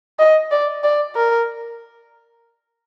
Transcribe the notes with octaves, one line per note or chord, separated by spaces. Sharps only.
D#5
D5
D5
A#4